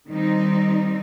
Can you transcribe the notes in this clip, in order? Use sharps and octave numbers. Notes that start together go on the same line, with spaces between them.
D#3 G3 C4 D#4